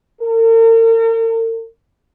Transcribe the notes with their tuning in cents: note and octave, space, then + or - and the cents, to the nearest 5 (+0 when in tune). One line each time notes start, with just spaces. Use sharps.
A#4 -45